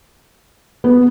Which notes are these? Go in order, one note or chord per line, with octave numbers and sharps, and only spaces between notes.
B3